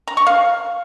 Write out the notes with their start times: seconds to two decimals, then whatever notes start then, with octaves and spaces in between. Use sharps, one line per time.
0.08 A#5
0.17 C#6
0.27 F5